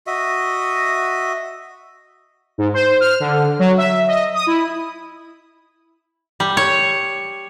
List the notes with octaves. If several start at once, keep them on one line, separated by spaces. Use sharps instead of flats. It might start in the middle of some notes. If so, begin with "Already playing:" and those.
F#4 D#5 E5
G#2
C5
F6
D3
F#3
E5
D#5
D#6
E4
G3
C#5